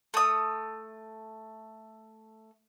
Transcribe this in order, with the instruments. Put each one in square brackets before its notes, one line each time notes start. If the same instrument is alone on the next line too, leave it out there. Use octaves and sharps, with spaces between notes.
[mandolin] A3 D#6